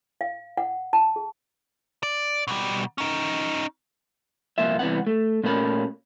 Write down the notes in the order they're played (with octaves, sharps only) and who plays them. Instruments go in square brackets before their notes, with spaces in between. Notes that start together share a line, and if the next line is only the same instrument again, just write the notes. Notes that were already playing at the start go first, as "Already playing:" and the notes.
[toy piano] F5
F#5
A5
G#4
[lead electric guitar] D5
B2 G3
C#4 D#4
[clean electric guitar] C2 F2 A#2 A#3 F4 E5
C2 E3 G#3 B3 C4 F#5
A3
A#2 A3 C#4 A#4 B5